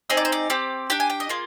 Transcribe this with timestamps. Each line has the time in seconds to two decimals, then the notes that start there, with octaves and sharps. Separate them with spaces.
0.10 C4 D#4 G#4 D#5
0.17 D5
0.25 C5
0.32 D5
0.50 C4 G4
0.90 D4 G4 G5
1.00 G#5
1.10 G5
1.20 D#5
1.29 A#3 F4 G#4